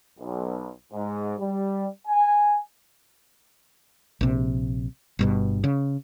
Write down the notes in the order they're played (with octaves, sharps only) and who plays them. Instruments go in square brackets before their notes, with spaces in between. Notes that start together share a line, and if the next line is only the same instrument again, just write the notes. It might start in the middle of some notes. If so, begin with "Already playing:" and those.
[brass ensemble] B1
G#2
G3
G#5
[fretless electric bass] A#1 C3
G1 G2 B2
C#3